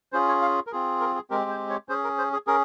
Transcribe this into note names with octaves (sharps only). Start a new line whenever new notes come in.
C#4 F4 G#4 C5
C#5
F5
A#4
C4 F4 G#4
A#4
G#4
G#3 C4 G4 A#4
C5
C#5
C#4 G#4 C5
A#4
C5
G#4
C#4 G#4 A#4